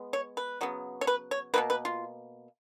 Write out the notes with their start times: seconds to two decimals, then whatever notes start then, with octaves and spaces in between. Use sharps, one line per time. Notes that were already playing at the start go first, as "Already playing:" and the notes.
Already playing: G#3 B3
0.13 C#5
0.37 B4
0.61 C#3 F#3 B3
1.01 C#5
1.07 B4
1.31 C#5
1.54 B2 F#3 A#3 B4
1.70 B4
1.85 F4